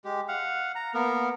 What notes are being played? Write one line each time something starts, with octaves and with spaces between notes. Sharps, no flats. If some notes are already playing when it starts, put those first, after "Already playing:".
G#3 G4
F5 F#5
A#5
A#3 B3 A#4